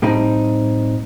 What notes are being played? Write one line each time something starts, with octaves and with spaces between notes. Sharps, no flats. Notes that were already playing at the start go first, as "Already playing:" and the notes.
A2 G3 C4 D#4